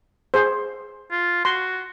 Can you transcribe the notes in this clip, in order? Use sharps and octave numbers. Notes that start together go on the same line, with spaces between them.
G#4 C5
F4
F#4 C6